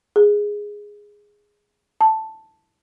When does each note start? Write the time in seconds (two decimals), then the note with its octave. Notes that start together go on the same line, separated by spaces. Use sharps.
0.16 G#4
2.01 A5